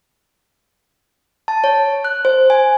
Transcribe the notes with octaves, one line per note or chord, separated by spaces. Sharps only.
A5
C#5
F#6
C5
G#5